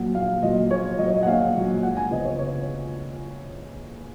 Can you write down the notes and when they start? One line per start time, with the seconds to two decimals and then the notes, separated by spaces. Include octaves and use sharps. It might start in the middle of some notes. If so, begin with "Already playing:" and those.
Already playing: A#1 A#2 F#3 F#5
0.15 A#1 F5
0.43 A#2 F#3 D#5
0.70 A#1 C#5
0.98 A#2 F#3 D#5
1.07 C#5
1.16 D#5
1.23 F#5
1.26 A#1 F5
1.55 A#2 F#3
1.83 C#2 F#5
1.97 G#5
2.11 C#3 F3 B3 D#5
2.25 C#5
2.39 C#5